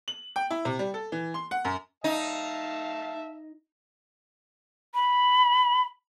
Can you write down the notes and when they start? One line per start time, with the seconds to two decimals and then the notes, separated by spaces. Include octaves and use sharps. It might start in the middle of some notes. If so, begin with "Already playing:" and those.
0.08 F#7
0.36 G5
0.50 E4
0.65 C3
0.79 G3
0.94 A4
1.12 E3
1.34 C6
1.51 F#5
1.65 F#2
2.04 D#4 E5 F5 A5
4.95 B5